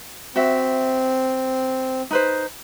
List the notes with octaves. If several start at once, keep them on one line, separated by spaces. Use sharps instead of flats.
C4 F#4 E5
D#4 B4 C5